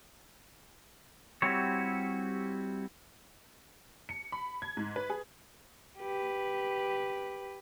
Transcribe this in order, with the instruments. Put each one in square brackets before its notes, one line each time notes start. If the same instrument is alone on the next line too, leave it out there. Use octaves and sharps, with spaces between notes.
[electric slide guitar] G3 C4 E4 F#4 G4 C#5
[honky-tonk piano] C#7
B5
G#6
G#2
B4
G#4
[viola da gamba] G4 B4